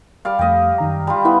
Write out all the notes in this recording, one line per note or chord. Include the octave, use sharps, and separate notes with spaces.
G3 D5 F5
F2 A3 G4 D#5
F#2 D#3 A#5
G3 F4
B3 E4